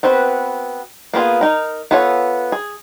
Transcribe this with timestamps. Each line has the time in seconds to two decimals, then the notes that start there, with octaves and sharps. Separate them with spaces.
0.03 B3 C4 F#4 B4
1.13 A#3 B3 F4 G#4
1.41 D#4 A#4
1.91 B3 F4 A4 C#5 F#5
2.52 G#4